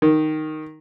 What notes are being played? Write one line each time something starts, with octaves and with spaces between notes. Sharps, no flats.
D#3